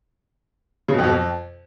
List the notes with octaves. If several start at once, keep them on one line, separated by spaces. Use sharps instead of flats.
C#3
B2
F2
B2
F2